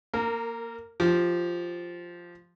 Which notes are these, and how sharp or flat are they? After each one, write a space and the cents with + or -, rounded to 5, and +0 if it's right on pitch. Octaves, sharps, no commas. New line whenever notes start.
A#3 +0 A#4 -25
F3 +0 G4 +0